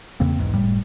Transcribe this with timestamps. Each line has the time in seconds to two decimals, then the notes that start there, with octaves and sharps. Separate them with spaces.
0.20 E2 C#3 A#3 C4
0.39 B1 E2 G#2
0.54 F#1 A2 G3